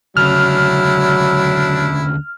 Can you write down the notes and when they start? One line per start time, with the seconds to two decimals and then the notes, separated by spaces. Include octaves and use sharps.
0.17 D2 C#3 F#3 D4 E4 F6